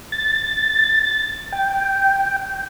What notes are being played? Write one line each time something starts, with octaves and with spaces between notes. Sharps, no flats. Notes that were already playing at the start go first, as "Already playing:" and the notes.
A6
G5